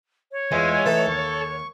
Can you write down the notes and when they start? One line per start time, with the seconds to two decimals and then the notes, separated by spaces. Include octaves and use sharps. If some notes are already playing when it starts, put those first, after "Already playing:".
0.32 C#5
0.52 E2 G#3 F4 E5 G#5
0.86 E3 A3 D#4 A4
1.06 D#2 C#6